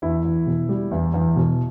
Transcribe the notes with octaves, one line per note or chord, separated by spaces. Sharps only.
E2 E4
E2
B2
G3
E2
E2
B2